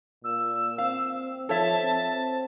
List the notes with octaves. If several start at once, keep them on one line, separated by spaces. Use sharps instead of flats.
A#2 E6
C4 F5
F3 A4 C#5 E5 A5
C4